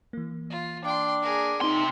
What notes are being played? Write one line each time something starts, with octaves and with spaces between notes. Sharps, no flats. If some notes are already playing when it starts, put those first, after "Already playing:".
E3 A#3
F4
D4 G5 C6
G#4 A#4
C3 C4 D#4 C6